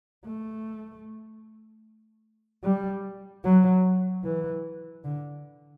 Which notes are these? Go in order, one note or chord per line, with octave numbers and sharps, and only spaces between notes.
A3
G3
F#3
E3
D3